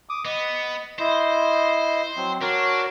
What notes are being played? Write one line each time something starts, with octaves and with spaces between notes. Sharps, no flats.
D6 D#6
B3 D#5
E4 C5 D#5
F#3 C4
D4 F#4 A#4 C#5